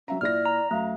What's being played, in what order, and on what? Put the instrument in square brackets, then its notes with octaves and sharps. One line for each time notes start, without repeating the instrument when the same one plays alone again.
[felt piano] F#3 E5 A#5 [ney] C#4
[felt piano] A#2 E4 A#6 [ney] D5 [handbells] F6
[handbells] A#5
[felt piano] F#2 [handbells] A3 [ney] F5